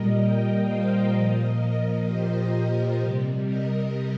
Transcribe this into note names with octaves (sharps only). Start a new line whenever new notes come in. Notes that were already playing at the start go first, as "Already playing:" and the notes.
Already playing: A#2 G3 A#4 D#5
D#5 G5
C5 F5
A#2 F3 A#4 D#5
G4 C5
C3 G3
A#4 D#5